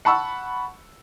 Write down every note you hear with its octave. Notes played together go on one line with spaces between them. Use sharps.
F#5 A5 B5 C#6 E6